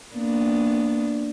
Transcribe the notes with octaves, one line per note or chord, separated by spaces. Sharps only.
A#3 B3 D4